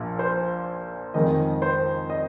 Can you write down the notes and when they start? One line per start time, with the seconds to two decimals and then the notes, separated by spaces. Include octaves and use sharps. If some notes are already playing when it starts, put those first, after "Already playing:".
Already playing: A#1 A#2
0.19 C5
1.14 F2 D#3 G#3 D#5
1.62 C5
2.10 D#5